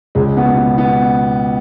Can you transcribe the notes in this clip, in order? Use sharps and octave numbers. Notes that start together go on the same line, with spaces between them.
C#2 G#3
B3
B2
B3
B3